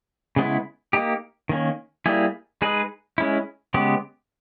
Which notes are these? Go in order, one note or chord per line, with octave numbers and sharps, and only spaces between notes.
C#3 G#3 B3 E4
A#3 D#4 G4
D#3 A#3 C#4
G3 A#3 E4 G#4
G#3 D#4 G#4 B4
G#3 C#4 E4
C#3 G#3 B3 G4